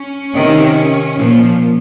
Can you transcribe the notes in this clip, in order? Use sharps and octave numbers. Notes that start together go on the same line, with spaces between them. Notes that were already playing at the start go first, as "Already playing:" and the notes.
Already playing: C#4
C3 D#3
A#2 F3